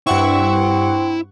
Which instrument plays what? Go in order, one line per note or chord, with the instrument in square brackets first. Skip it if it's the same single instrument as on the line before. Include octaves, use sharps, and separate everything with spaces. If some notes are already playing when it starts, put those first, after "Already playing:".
[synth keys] G2 F#5 C#6 [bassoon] C4 [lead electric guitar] E4